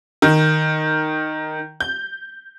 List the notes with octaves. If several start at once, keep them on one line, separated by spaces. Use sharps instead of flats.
D#3
G6